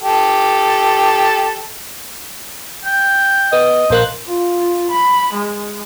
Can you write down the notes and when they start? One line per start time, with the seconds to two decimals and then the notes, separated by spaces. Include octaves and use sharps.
0.02 G4 A4
2.85 G5
3.53 B3 D#5
3.90 A#1 A#3 C5 F#6
4.27 F4
4.90 B5
5.33 G#3